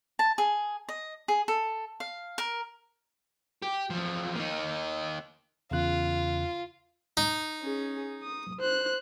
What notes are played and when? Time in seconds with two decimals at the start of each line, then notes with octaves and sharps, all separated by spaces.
0.19 A5
0.38 G#4
0.89 D#5
1.28 G#4
1.48 A4
2.00 F5
2.38 A#4
3.62 G4
3.90 E2 F3
4.35 A#3 D#4
5.71 E2 C#3 F4 F#6
7.17 D#4
7.62 C#4 G#4
8.23 D#6
8.60 C5 F#6